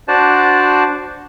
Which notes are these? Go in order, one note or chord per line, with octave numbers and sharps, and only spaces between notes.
D4 F#4 C5 D5 A5